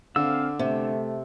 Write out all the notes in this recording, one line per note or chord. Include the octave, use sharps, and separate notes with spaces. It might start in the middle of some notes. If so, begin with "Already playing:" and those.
D3 C4 F5 E6
C3 A3